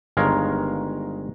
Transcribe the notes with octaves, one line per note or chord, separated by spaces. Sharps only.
G1 D#3 G#3 A#4 C#5 F5